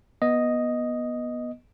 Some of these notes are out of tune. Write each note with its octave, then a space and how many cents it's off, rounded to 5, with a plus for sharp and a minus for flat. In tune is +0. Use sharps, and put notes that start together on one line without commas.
B3 -20 D#5 +0